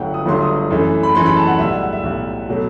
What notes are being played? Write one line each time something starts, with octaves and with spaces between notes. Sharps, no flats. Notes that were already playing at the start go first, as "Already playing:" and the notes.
Already playing: G1 G2 F#3 A3 F#5 G5
D#6
G1 G2 F#3 A3 C6
D#6
F#2 E3 A3
B5
F#2 E3 A3 C6
B5
A5
F#5
B1 A2 G3 E5
F#5
F#5
E5
B1 A2 G3
B2 F#3 A3